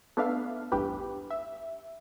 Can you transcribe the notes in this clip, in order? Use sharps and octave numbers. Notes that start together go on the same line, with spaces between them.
A3 B3 D4 E5 F5
A1 E2 G2 G4 B4
E5